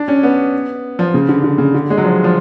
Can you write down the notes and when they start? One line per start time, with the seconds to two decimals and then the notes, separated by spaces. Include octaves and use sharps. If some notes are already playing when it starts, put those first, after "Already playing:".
Already playing: D4
0.08 C#4
0.23 B3
0.99 F3
1.14 C#3
1.29 D3
1.44 D3
1.58 C#3
1.74 D3
1.90 G#3
1.97 F#3
2.04 F3
2.24 F3